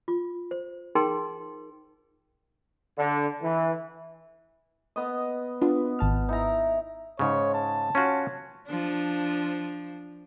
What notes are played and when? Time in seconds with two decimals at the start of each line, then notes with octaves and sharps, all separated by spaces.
0.08 F4
0.51 C5
0.95 D#4 G#4 A#4 G5 C6
2.97 D3
3.43 E3
4.96 B3 D#5
5.62 B3 D4 F4
5.99 G#1 A5 F6
6.29 D#4 E4 A#5
7.19 G#2 C#3 C#5
7.54 A5
7.95 C#4 F4 F#4
8.67 F3 D4